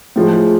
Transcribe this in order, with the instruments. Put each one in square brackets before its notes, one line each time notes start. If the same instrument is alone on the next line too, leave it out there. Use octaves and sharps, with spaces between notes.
[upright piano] A2 F3 G#3